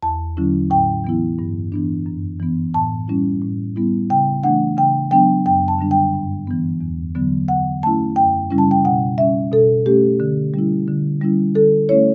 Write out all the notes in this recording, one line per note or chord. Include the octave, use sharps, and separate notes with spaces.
E2 A5
D3 F#3 C#4 E4
A2 G5
E3 B3 E4
G2
E3 B3 D4
F#2
E3 B3
A2 A5
G3 C#4 E4
A2
G3 B3 E4
C#3 G5
E3 A3 D4 F#5
C#3 G5
F#3 B3 D4 G5
F#2 G5
A5
D3 G3 D4
G5
G2
E3 B3
E2
D3 F#3 B3
D3 F#5
A3 C#4 E4 A5
F#2 G5
C#3 G3 C#4 E4
A5
G5
B2 F#5
G3 C#4 E5
B2 A4
A3 C#4 G4
D3
G3 C#4 E4
D3
G3 C#4 E4
D3 A4
A3 C#4 E4 C#5